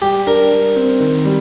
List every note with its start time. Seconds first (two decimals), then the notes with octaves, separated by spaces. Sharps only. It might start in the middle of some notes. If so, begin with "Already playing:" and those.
0.02 G3 G4
0.26 D4 A#4
0.52 G3
0.76 C4
1.00 D#3
1.25 G3